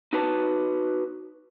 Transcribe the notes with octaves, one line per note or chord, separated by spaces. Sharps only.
D#4 F#4 B4 A5